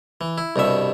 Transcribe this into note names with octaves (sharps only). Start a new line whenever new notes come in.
E3
E4
C2 G2 B2 E5